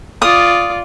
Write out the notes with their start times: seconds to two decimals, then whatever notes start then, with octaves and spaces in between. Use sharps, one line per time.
0.22 F4 D5 D#6